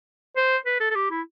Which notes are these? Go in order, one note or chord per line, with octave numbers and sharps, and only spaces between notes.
C5
B4
A4
A4
G4
E4